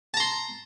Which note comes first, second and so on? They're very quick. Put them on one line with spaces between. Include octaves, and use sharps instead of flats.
A5 A#5 C6